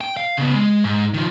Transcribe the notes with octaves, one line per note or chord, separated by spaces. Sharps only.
G5
F5
C#3 B3
G#3
G#2
D#3 F3